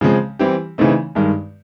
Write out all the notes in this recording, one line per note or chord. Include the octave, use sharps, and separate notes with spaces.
C#3 F3 G#3 C4
E3 G3 C4 E4 G4
C#3 E3 A3 C4 D#4
G2 D#3 G#3